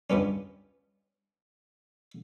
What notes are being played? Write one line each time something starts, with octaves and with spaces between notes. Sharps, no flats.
C#2 G2 B3 C#4